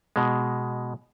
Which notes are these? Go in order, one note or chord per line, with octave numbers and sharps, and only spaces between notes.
B2 G#3